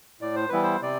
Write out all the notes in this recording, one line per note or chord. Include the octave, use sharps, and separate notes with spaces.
A2 D5
C5
E3 G3 B3 E4 B4
C5
C3 D5